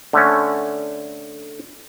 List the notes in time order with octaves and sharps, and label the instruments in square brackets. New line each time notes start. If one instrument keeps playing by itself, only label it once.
[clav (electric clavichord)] D3 A3 C#4